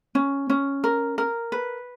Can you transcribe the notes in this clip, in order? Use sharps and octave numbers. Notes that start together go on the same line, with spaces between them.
C#4
C#4
A#4
A#4
B4